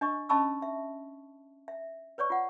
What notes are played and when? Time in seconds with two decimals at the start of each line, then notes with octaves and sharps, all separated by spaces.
0.01 D4 D#5 C#6
0.29 C#4 D#5 A5 B5 C#6 E6
0.62 E5
1.68 E5
2.18 B4 C#5 D5 C#6
2.30 F4 F#5